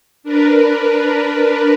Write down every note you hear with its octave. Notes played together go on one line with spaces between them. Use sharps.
D4 A#4 B4